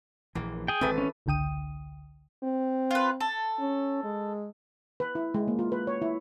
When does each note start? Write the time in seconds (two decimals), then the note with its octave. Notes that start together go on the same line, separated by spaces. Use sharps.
0.35 A#1 E3 A#3
0.68 G#4 G5
0.81 G#1 G#2 E3 C4 A4 B4
0.98 C#4
1.26 G#1 C#2 D3 G5 D#6 D#7
2.43 C4
2.91 F4 B4
3.20 A4
3.59 C#4
4.04 G#3
5.00 B4
5.15 E4
5.34 G#3
5.48 A#3
5.59 F4
5.72 B4
5.87 C#5
6.02 E4